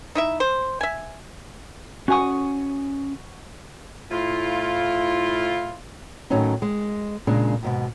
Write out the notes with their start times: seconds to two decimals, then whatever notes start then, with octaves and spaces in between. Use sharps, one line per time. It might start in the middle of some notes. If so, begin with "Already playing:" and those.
0.15 D#4 E4 E5
0.40 C5
0.81 E5 G#5
2.08 C#4 F#4 G#5 C#6 D#6
4.11 A2 E4 F4
6.30 A2 D#3 F#3 C#4 D#4
6.62 G#3
7.27 A#2 C#3 G#3 D4
7.63 D#2 G#2 B2